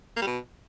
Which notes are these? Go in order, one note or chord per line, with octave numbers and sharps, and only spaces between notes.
A#3
G3
B2